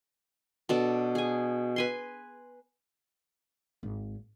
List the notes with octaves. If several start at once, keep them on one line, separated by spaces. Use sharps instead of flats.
B2 D4 A4
G#4 G#5
B4 G#5 C6
G#1